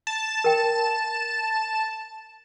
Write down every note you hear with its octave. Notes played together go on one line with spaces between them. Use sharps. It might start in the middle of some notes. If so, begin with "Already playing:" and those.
A5
A#4 G5